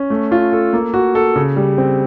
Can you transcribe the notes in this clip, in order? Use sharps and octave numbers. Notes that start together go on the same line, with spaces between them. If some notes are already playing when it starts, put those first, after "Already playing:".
Already playing: C#4
A3
F4
A4
A#3
F#4
A4
C#3
G3
C4